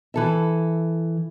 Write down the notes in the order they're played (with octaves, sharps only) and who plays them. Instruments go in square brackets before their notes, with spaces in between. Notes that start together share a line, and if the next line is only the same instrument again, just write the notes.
[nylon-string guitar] E3 A4 E5